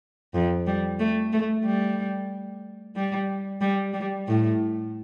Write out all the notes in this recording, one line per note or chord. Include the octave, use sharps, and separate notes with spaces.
F2
G3
A3
A3
G3
G3
G3
G3
A2